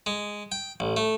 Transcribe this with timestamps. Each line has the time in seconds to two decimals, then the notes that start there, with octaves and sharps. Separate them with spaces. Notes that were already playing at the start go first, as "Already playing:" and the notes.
0.06 G#3
0.52 G5
0.80 A1
0.97 A3